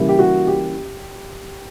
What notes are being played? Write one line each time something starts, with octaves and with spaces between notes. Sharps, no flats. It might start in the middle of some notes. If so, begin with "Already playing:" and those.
Already playing: C#3 E3 G3 A#3
G4
F#4
G4